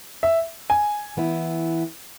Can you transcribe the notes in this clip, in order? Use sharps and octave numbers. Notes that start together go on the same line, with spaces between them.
E5
G#5
E3 B3 E4